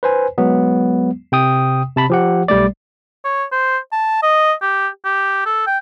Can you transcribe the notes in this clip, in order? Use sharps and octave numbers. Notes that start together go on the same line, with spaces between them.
B4 C5 G#5
F#3 G#3 B3
C3 G5 D#6
C3 A5 B5
F3 G4 F#5
B1 G3 A3 D5
C#5
C5
A5
D#5
G4
G4
A4
G5